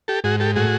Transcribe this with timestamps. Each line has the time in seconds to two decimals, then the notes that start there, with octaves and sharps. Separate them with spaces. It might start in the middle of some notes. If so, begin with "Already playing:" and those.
0.08 G4 A4
0.24 G#2 F#4 G#4
0.40 G4 A4
0.56 A2 F#4 G#4